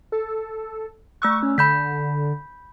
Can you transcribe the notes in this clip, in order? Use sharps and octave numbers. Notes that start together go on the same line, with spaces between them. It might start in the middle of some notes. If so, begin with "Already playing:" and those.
A4
A3 C#6 E6 F#6
C#4
D3 B5 G6 B6